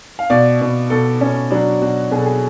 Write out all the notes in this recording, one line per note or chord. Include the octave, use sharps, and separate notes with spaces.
F5
B2 D5
B2
B2 A4
B2 C#4
F#3 D4
B2 F#4
B2 G#4
A4
G#4